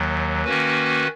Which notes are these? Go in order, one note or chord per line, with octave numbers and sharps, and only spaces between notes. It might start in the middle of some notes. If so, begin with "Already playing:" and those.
Already playing: D#2 D#3 F#3
D#3 A#3 C#4 F#4 B4